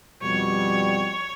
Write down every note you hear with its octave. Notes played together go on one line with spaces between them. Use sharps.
F2 B2 G3 C#5